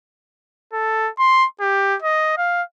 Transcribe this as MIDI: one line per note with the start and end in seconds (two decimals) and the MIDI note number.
0.73 1.10 69
1.19 1.46 84
1.61 1.96 67
2.02 2.32 75
2.37 2.63 77